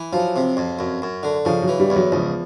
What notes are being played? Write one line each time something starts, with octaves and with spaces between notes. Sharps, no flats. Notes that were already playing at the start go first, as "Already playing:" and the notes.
Already playing: E3
F3 F#3
C3
F2
F#2
F#2
D3
C#3 F3
F#3
E3
G3
E2
F#3
C#2 F3